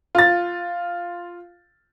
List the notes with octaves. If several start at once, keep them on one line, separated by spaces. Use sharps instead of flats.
F4 A6